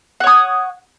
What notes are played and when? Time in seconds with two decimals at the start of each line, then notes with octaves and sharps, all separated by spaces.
0.20 F#5
0.24 C#5
0.27 D#6